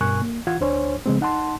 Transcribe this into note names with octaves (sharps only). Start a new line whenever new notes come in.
G2 B2 A#4 G#5 C#6 F#6
A#3
E3 F4 F#5 G#6
D2 D4 C5 C#5 G#5
C#3 F3 G#3 B3 C4
D#4 F#5 A5 C6